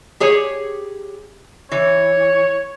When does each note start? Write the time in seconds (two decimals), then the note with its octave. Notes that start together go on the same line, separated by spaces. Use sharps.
0.20 G4 G#4 C#5
1.72 E3 C#5